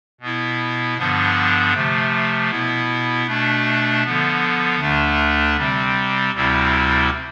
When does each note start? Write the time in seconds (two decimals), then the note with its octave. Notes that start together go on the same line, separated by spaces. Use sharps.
0.21 B2 B3 E4
0.98 G2 D3 F3 B3 D4
1.74 C3 F3 A3
2.50 B2 B3 E4
3.27 B2 A3 D4
4.04 D3 F3 B3
4.80 D2 D3 A3 D4
5.57 C3 G3 C4
6.33 D2 C3 G3 C4 E4